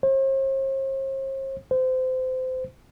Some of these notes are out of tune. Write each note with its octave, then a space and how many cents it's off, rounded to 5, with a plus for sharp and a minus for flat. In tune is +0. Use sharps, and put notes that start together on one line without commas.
C5 +45
C5 -25